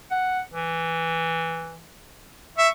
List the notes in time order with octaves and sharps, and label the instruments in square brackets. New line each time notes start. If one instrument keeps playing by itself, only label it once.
[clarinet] F#5
E3
[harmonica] E5 [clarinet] C#6